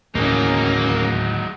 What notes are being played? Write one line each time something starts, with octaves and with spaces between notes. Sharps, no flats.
D1 D#2 E3 F#3 G#3 A#3 C#4 D#4